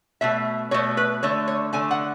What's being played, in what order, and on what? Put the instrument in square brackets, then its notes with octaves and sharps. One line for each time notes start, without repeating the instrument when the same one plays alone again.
[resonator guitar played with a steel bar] B2 A3 E5
B2 A3 C#5
B4
D3 A3 C#5
C#5
D3 A3 G#5
F#5